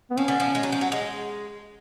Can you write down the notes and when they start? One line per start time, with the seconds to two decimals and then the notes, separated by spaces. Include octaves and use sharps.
0.11 B3
0.17 F3 C#4
0.28 D3
0.40 F3
0.55 G#3
0.63 F#3
0.72 F3
0.81 F#3
0.92 G#3